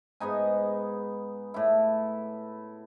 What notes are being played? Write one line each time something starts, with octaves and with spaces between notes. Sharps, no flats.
G#2 B3 D#4 G#5
A2 E4